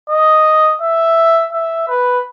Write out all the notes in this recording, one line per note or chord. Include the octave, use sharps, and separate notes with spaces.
D#5
E5
E5
B4